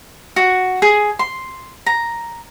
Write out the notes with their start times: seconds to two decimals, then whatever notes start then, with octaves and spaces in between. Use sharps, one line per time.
0.36 F#4
0.82 G#4
1.19 C6
1.86 A#5